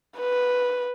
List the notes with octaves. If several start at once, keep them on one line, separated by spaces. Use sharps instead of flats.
B4